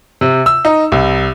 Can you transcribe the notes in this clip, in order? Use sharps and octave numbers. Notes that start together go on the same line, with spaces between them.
C3
E6
D#4
C2